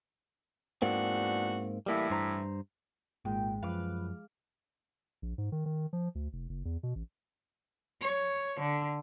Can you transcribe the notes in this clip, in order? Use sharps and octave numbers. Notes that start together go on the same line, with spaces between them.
E2 G#2 A#3 C4 D4 F#4
A2 E3 G3 A#3 E4
G2 C5 A#5
G#1 A#2 G#3 G5
F#2 F3 B4 F5 D6
A#1
G#2
D#3
D#3
F3
D2
F1
F#1
E2
B2
A1
C#5
D3